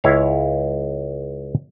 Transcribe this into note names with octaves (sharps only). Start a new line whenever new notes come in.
C#2 E4 C#5 F5